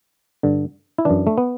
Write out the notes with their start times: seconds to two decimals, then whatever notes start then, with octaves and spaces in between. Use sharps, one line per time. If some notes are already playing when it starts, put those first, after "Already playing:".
0.43 G2 D3
0.98 E4
1.05 F#2 E3 D4
1.27 A3
1.38 B3